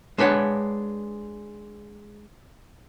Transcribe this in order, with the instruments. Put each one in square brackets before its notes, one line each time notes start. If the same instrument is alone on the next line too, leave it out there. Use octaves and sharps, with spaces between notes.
[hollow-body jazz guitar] G#3 D4 B4 C#5 F#5